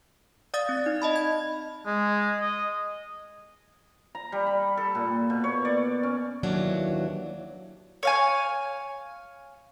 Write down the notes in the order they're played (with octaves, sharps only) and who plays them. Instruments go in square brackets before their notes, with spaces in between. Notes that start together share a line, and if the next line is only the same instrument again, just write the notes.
[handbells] D5 F5 D#6 A6
C4
D#4
D#5 A5 B5
G#6
[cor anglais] G#3
D#5
[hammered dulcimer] A#5
G3
B5
A4
A#2
B2
C#5
D5
C#4
[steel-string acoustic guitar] D#2 E3 F#3 D4
[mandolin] C#5 F5 G#5